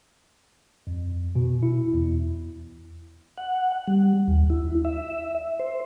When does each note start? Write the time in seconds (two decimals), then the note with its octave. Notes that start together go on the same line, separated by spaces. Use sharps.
0.87 F2
1.35 B2
1.63 E4
1.94 E2
3.38 F#5
3.87 G3
4.28 D#2
4.50 E4
4.85 E5
5.60 C5